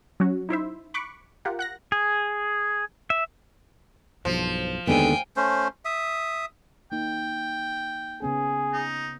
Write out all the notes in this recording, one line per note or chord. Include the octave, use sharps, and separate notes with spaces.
F#3 C#4 F#4
D#4 E4 C5 E5
B5 C#6 D6 F#6
F4 G4 A#4 F#5
F#5 F#6 A#6
G#4
E5
B1 G2 F3
D#2 D3 D#3 G#3 B3 G5 G#5
A3 C#4 C5
E5 D#6
A#3 D#4 G5
C#3 B3 C#4 G#4
D#4